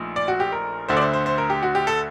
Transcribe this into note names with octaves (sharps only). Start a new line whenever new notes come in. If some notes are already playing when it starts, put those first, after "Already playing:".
Already playing: A#1 A#2 A3 D#4
D5
F#4
G4
A#4
D2 D3 A3 C5
D5
C5
C5
C5
A#4
G4
F#4
G4
A4